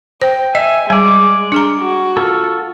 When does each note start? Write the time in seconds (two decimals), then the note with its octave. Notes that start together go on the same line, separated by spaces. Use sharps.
0.22 C5 G5
0.55 D#5 E5 G#5
0.90 G3 G#3 D5 G#5
1.52 D4 G#4 A#5
1.81 F#4
2.17 F4 A4